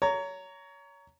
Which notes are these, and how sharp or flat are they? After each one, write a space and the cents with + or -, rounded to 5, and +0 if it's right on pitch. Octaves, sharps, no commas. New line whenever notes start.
C#5 +25 A#5 -10